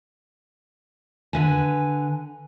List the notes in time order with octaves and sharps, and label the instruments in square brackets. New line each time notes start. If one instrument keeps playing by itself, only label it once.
[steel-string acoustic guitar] D3 B4 G#5